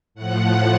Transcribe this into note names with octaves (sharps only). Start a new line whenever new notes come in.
A2 F3 F#5